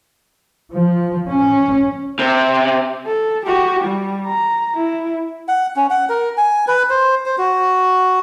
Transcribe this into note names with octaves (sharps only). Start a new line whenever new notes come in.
F3
C#4
C3
A4
F#4 G4
G3
A#5
E4
F#5
C#4
F#5
A#4
G#5
B4
C5
C5
F#4